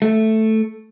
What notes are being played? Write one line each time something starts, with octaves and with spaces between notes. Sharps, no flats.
A3